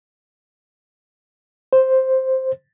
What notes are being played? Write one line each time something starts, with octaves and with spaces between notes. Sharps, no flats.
C5